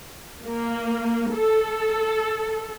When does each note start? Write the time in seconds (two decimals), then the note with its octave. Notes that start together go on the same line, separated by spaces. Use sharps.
0.46 A#3
1.32 A4